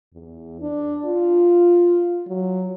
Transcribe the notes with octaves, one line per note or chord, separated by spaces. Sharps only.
E2
D4
F4
F#3